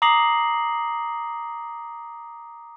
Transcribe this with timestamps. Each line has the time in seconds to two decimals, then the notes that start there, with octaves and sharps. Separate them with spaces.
0.02 A#5 D6 D#6 A#6 C7 F#7